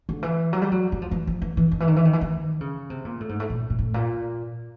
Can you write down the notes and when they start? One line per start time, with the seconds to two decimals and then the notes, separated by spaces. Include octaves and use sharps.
0.09 D3
0.23 E3
0.53 F#3
0.62 G3
0.72 F#3
0.92 F#3
1.02 F3
1.11 E3
1.27 F3
1.42 E3
1.57 E3
1.71 D#3
1.80 E3
1.88 D#3
1.96 E3
2.05 D#3
2.13 E3
2.21 D#3
2.61 C#3
2.90 C3
3.05 A#2
3.20 A2
3.29 G#2
3.40 A2
3.50 A#2
3.70 A#2
3.79 A2
3.94 A#2